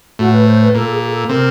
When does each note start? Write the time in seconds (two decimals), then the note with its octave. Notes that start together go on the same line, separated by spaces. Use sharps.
0.19 A2 F#4
0.33 B4
0.47 C5
0.61 B4
0.75 A#2 A4
0.86 A4
0.93 G#4
1.11 A4
1.29 C3 A#4